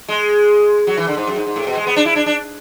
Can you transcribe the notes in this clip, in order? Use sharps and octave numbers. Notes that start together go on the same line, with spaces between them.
G#3
F#3
E3
D3
G#2
F#2
G#2
G#2
A2
B2
G#3
B3
D4
E4
D4
D4